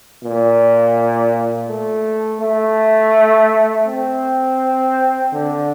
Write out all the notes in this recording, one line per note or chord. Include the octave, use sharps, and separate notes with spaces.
A#2
A3
A3
C4
D3